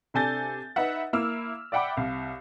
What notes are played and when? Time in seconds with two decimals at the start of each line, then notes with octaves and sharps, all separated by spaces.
0.14 C3 D4 A4 G#5 G6 A6
0.76 D#4 B4 E5 F#5
1.13 A#3 E4 E6 F6
1.72 D5 E5 F#5 G5 B5 D6
1.97 C2 F5